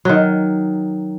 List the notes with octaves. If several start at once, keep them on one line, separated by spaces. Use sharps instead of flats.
D#3 F#3